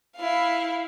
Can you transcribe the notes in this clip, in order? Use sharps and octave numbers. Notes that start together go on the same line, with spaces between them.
E4 F5